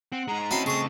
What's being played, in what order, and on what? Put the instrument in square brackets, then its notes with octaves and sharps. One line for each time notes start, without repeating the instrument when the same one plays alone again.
[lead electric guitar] C4 [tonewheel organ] F#5
[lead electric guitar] G#3 D#4 [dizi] A#5
[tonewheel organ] C4 D#5 A5 [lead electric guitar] C#4 E4 [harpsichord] F#4 B5 C6
[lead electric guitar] C#3 A3 [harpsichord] G#4 D#6 [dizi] C#6